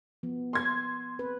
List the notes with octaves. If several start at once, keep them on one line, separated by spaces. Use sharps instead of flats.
F3 B3
C6 G#6
C4 B4